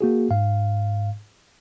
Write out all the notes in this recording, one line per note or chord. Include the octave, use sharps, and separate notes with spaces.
A#3 F#4 G#4
G#2 F5